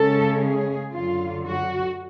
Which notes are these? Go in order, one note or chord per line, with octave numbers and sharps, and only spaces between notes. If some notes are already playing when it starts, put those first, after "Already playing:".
Already playing: C#3 G#3 C#4 A4
G#4
F#2 D3 F#3 F4
F#4